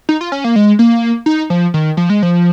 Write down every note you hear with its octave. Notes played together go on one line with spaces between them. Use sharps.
D#4
F4
C#4
A#3
G#3
A#3
D#4
F3
D#3
F3
G#3
F3